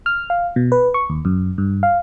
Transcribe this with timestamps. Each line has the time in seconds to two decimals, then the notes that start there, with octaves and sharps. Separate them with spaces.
0.06 F6
0.30 F5
0.56 B2
0.72 B4
0.94 C#6
1.10 D#2
1.25 F#2
1.58 G2
1.83 F5